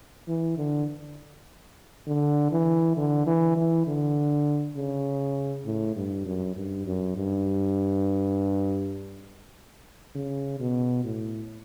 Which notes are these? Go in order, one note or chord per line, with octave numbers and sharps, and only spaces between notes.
E3
D3
D3
E3
D3
E3
E3
D3
C#3
A2
G2
F#2
G2
F#2
G2
C#3
B2
A2